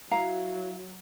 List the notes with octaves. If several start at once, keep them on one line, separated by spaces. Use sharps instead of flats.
F#3 E4 F5 A#5